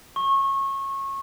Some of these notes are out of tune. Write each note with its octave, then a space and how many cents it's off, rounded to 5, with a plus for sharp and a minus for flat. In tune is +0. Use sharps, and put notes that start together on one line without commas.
C#6 -25